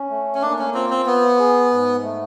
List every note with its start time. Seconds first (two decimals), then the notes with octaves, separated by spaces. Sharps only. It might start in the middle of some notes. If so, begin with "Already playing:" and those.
Already playing: C#4
0.10 A3
0.35 C#4
0.42 A#3 D4
0.59 C#4
0.74 C4 F4
0.90 C4
1.06 B3 C5
1.39 G#4
1.71 G#2
2.03 A3